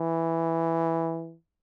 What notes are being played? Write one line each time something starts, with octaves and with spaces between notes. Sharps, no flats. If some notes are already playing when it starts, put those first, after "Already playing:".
Already playing: E3